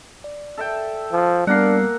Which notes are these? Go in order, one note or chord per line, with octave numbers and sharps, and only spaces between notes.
D5
A4 E5 G5
F3
G3 A#3 B3 D4 A#4 F#5 C7